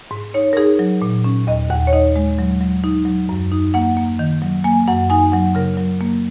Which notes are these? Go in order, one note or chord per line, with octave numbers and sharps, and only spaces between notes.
G#2
D#4 C#5
A#4
D#4 G#4
F#3
A#2
C#4
D#2 D#5
D#2 F#5
C#5
D#4 D#5
G#3
F#3
F#3
D#4
F#3
F#2
D#4
A#3 F#5
A#3
D#3
F#3
A#3 G#5
F#2 F#5
D#4 G#5
F#3 F#5
C#3 A#4
F#3
A#3